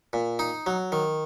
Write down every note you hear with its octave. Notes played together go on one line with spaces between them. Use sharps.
A#2
D#4
F#3
D#3